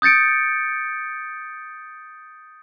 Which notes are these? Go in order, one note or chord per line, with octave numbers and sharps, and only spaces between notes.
D#6 G6 A6 C#7 D7